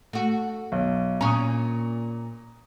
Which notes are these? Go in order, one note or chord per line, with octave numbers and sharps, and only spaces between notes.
A3 F#4
B1
A#2 C#4 A#5 C#6 D#6